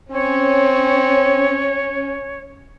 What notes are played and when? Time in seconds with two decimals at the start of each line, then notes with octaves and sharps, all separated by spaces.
0.12 C4 C#4 C#5